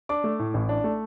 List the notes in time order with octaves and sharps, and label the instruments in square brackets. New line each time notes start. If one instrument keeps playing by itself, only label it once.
[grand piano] D4 D6
A3
A2
A1
D4
A3